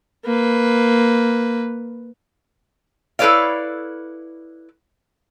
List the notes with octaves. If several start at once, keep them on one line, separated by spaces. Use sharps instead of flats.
A#3 B4
E4 A4 B4 C#5 D5 F5